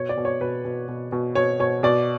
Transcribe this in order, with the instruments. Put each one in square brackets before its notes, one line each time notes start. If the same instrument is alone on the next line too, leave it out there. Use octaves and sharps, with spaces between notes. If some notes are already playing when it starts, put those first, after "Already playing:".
Already playing: [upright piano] B2 C#5
D5
B2
C#5
B2 B4
B2
B2
B2
B2 C#5
B2 C#5
B2 D5